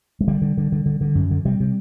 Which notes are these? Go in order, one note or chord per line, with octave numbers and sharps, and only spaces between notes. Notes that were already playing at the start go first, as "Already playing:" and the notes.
G#3
D3 G3
D3
D3
D3
D3
D3
F#2
D3
C3 G3
C3